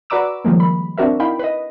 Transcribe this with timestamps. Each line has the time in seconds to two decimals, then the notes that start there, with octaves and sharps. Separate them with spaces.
0.10 F#4 B4 D5 A#5 D6 E6
0.45 D#3 F3 G3 G#3 A#3
0.60 B5
0.98 C4 D4 F#4 A#4 E5
1.19 D#4 E4 F5 G5 B5
1.39 B4 D#5